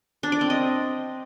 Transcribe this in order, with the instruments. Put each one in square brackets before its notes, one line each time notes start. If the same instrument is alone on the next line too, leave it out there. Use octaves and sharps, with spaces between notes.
[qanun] D4
D5
C4
D#5